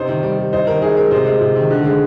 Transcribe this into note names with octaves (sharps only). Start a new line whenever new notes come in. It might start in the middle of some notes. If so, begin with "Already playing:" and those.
Already playing: C3 D#4 C5
D#3
G3 D5
G3
D#4 C5
D#3 A#4
D#4 G#4
G#3 A#4
C3 C5
G#3
C3
D#3
D3
G#3